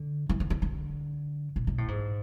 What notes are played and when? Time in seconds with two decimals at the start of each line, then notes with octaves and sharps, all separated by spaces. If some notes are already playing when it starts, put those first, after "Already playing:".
Already playing: D3
0.29 E3
0.40 D3
0.50 D3
0.62 D3
1.56 B2
1.67 B2
1.78 A2
1.88 G#2